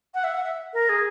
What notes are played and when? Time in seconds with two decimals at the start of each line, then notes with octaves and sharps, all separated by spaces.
0.14 F#5
0.24 E5
0.34 F#5
0.44 E5
0.73 A#4
0.89 G#4